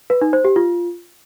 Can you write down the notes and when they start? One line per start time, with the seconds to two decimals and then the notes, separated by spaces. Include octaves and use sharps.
0.10 B4
0.21 D#4
0.33 C5
0.45 G4
0.56 F4